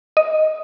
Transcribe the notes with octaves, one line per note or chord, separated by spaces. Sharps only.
D#5